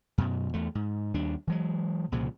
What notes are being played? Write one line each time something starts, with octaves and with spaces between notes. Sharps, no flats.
F#2 B2
E2 A3
G#2
D#2 G3 D4
E3 F#3 G#3
C2 A#2 C#3 F3